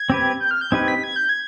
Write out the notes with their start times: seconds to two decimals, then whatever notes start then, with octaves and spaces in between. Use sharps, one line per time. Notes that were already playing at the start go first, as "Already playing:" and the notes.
Already playing: G#6
0.10 C4 G4 B4
0.40 G6
0.51 F6
0.61 G6
0.72 C4 D#4 G4 B4 G#6
0.88 B6
1.04 G#6
1.16 G6
1.29 G#6